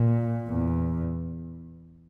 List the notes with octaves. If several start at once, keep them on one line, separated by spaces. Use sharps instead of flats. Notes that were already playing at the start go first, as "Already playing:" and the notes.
Already playing: A#2
E2